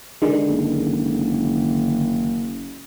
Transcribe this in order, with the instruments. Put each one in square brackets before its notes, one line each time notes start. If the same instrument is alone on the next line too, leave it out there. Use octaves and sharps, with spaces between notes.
[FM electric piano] D3 D#3 G#3
[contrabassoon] F#1